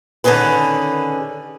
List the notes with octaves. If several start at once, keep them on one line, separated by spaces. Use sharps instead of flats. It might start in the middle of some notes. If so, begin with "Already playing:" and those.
D3 D#3 C#4 G#4 B4